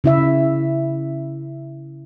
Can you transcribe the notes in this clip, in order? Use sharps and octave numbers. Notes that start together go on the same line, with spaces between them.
C#3 E4 E5